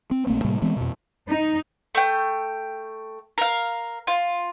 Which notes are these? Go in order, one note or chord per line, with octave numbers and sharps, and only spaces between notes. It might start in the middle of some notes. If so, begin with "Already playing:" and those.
C4
A#1 A3 A#3 C4
A2 C3 G3 A#3
E3 G#3 B3 C4
F2 B2
D#4
A3 G5
A#4 F5
F4